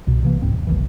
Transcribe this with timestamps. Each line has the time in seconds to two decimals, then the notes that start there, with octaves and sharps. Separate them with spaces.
0.07 C2 B2
0.23 C3 E3 A#3
0.42 C2 G#2 C4
0.54 D#1
0.67 F1 B1 D#3 E3